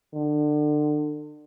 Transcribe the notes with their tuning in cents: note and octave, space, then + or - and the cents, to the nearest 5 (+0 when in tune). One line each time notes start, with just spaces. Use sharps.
D3 +30